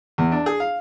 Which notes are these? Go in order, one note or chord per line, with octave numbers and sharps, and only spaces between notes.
E2
D4
G#4
F5